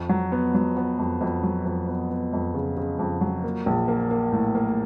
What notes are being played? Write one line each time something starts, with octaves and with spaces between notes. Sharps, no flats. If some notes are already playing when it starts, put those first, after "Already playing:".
Already playing: F2
F#3
B3
F#3
B3
F2
F2
F#3
F2
B3
B3
F2
C#3
C#3
F2
F#3
A#3
A#1
A#3
A#3
A2
A#3